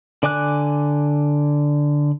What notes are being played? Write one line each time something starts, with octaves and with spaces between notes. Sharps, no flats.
D3 D5 G#5 D6 F#6